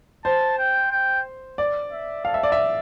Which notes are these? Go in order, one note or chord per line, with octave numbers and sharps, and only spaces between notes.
C5 A5
G5
G5
D5
E5
A4 F5
E5
D5
E5